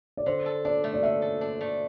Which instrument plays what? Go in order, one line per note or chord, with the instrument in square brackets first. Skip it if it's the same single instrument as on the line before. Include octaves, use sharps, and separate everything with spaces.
[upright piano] D5
[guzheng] D3 [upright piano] C5
[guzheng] A4
[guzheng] D4 [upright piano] D5
[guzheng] A3
[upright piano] D5
[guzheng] D3 [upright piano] E5
[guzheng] A4
D4
A3